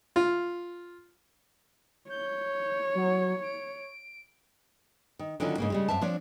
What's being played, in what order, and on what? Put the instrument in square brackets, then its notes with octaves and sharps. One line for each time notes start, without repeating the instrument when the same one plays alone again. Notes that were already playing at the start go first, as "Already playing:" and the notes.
[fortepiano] F4
[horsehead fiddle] C#5 [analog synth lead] G6
[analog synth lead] F#3
D7
[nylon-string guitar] D#3
D3 D#3 F#3 C#4 E4 F4
G#2 C#3 A#3
C#3 G3 G#3
F#2 C4 E5 F5 A5
F3 C4 D4 C#5